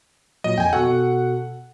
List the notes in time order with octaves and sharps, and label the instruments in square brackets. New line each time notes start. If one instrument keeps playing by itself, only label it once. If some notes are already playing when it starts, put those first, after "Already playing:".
[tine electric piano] A#2 F#3 [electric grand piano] D#5
[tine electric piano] F2 [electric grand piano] G5 G#5
[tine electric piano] B2 F#4 A4 [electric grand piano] F#5